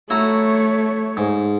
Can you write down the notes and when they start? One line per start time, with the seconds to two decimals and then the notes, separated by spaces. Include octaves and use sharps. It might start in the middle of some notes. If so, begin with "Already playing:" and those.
0.10 A3 E4 F#4 C#5 A#5
1.17 G#2